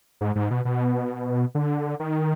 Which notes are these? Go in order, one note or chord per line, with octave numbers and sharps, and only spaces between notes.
G#2
G#2
B2
B2
D3
D#3